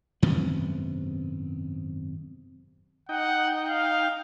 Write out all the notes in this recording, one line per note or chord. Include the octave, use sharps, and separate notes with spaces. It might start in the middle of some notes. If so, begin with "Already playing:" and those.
G#1 F#2 C3 B3
D#4 F#5 G5
F5